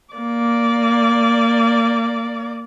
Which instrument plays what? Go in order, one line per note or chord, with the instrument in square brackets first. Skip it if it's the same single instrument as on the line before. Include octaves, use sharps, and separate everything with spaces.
[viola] A#3 D5